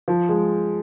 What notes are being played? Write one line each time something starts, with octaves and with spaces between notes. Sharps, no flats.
F3
G#3